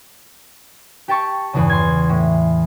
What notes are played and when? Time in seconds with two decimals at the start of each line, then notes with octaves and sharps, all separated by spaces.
1.08 G4 G5 A5 C#6
1.53 E2 G2 C#3
1.70 C6 G#6
2.10 A2